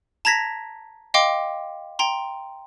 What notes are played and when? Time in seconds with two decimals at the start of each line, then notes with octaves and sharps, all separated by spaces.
0.25 A5 A#5 G#6 A#6 B6
1.14 D#5 F5 G5 C6 D6
1.99 G5 A#5 C6